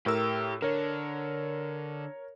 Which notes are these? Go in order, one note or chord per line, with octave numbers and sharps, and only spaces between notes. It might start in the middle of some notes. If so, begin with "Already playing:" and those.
A2 G4 A#4 E6
D3 A#4 C#5